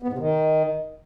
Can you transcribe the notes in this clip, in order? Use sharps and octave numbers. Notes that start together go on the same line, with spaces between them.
B3
G#2
C3
D#3